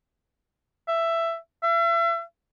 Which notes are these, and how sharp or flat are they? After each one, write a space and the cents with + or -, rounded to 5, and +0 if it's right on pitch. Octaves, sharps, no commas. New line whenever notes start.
E5 +10
E5 +40